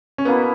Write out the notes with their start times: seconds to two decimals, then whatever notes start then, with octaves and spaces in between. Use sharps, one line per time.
0.18 C#4
0.25 B2 A#3 B3 E4